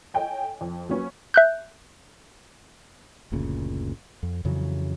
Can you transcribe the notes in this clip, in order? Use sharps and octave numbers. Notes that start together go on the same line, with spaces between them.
A4 C#5 D#5 G5 G#5
F2
F#3 A#3 C#4 B4
E5 F#6 G6
F#1 D2 A#2 C#3
F2
F2 C#3 E3 F#3